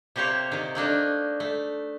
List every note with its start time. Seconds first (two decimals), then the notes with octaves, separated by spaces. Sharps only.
0.16 C3 A#3 G4 C5 C#5
0.52 C3 D#3
0.75 A3 A#3 D4 D#4
1.40 A3